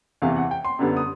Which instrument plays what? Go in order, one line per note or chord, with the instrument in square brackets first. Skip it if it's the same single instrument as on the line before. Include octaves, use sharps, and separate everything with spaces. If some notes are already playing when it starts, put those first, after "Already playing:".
[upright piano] E2 C3 E3 F5
F#5
G5
C6
F#2 D3 G3 B3
D#6